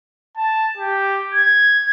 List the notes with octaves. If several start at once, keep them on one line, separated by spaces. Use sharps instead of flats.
A5
G4
G#6